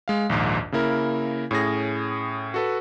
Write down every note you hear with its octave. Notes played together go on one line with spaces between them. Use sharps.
G#3 F5
A#1 D#2 G#2
C#3 A#3 E4 A#4
A2 C#4 G#4 A#6
F#4 A4 B4